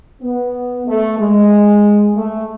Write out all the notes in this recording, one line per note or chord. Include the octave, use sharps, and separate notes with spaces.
B3
A3
G#3
A3